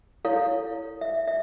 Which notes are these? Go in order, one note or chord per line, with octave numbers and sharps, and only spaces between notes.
E4 A4 C#5 F5
E5
E5